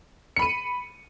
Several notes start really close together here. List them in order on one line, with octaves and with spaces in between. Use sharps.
C#7 B5 D#7